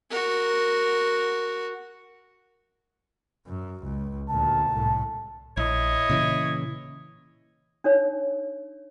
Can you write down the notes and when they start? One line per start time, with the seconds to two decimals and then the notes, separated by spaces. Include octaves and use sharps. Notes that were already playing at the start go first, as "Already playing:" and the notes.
0.10 F#4 A#4
3.47 F#2
3.84 C#2
4.30 D2 A#2 A5
4.69 C2 A2
5.57 A#1 E4 C#5 D#5
6.10 A#2 C#3 E3
7.84 D4 D#4 C#5